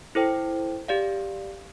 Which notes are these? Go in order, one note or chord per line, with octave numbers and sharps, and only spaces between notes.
E4 A4 C5 G5
G4 D5 F5